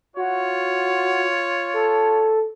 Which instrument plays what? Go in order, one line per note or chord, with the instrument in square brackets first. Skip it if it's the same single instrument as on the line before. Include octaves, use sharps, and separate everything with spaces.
[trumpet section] F4 C#5 [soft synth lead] F#4
[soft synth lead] A4